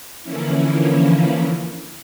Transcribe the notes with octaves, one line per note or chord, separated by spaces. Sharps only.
D3 E3 F3 A#3 C#4 E4